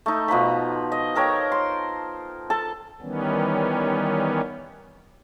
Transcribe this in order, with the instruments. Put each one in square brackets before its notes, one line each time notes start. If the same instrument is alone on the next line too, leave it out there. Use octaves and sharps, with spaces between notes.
[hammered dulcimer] A3 D#4
B2 F3 A#5 B5
D#5
A4 A#4 C#5 G5
C6
A4 A5
[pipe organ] D#3 E3 G3 B3 C#4